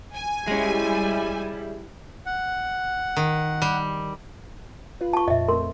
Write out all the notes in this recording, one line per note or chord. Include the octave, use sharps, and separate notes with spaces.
G#5
G3 G#3 C#4 E4
F#5
D#3
G3
F4 B4
A5 C#6
F2 A#2 D#5 E5
A3 C4 A#4 C6